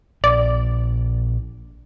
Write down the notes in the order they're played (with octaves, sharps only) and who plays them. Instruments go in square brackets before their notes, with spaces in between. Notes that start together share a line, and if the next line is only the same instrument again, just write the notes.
[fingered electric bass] A#1 [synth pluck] D5